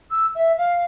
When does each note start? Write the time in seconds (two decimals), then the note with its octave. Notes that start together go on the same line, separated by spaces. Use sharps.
0.10 E6
0.35 E5
0.57 F5